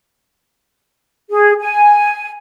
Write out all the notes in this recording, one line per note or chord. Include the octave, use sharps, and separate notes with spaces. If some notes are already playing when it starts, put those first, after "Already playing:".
G#4
G#5